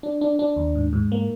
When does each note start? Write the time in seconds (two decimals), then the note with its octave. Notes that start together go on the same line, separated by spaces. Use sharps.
0.03 D4
0.21 D4
0.39 D4
0.56 D#2
0.75 G#2
0.93 G#2
1.12 A#3